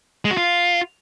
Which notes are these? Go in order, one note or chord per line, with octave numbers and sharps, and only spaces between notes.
G#3
F#4
F4